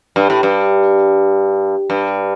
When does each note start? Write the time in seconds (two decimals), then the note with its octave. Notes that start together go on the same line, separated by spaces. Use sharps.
0.16 G2
0.30 A2
0.43 G2
1.90 G2